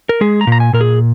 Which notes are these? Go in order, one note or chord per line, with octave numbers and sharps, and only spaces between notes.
A#4
G#3 G#4
A#5
A#2
A#5
G#5
A#2 A#4
G#4